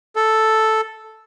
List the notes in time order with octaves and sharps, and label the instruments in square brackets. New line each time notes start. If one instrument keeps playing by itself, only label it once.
[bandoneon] A4